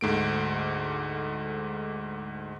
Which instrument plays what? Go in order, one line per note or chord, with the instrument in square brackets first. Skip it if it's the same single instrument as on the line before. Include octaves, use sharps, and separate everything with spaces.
[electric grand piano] D2 G#2 A3 D7